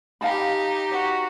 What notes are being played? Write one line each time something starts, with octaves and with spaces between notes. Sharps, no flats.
D#4 G4 F5 A5 B5
F#4